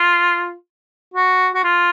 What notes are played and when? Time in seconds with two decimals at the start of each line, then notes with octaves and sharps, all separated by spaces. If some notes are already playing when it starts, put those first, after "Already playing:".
Already playing: F4
1.14 F#4
1.54 F#4
1.63 F4